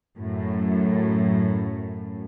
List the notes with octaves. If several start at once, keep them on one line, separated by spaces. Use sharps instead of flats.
F#2 A2